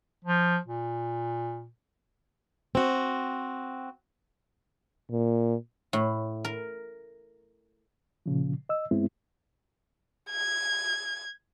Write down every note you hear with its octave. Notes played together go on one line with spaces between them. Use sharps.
F3
A#2
C4 F#4
A#2
A2
A#4
A#2 C#3 F3
D#5 E6
G2 G#3 B3 C4 E4
G#6